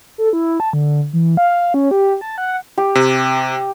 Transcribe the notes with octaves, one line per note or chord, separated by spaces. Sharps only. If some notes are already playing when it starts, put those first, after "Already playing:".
A4
E4
A5
D3
E3
F5
C#4
G4
A5
F#5
G4
C3